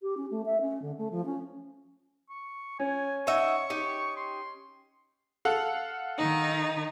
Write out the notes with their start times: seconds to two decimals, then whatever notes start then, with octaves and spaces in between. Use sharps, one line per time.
0.01 G4
0.17 C#4
0.30 A3
0.45 E5
0.61 C#4
0.81 D3
0.97 A3
1.11 F3
1.25 C#4
2.29 C#6
2.80 C#4 G#5
3.27 D#4 F#4 E5 C#6
3.70 D#4 G4
4.17 C6
5.45 A4 F5 F#5
6.18 D#3 D#4